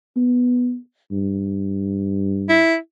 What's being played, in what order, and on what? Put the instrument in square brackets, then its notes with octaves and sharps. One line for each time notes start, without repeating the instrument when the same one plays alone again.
[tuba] B3
G2
[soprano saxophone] E4